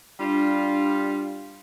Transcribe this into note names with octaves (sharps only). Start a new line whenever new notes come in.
G3 D4 F4